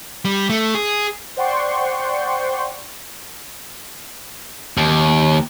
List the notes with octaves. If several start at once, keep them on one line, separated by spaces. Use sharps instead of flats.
G3
A3
G#4
C5 D5 F#5 G5 C6 C#6
D#2